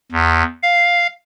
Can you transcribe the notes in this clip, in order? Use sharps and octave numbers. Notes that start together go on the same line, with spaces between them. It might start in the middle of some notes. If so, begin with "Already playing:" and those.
E2
F5